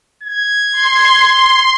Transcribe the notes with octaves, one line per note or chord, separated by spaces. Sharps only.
G#6
C6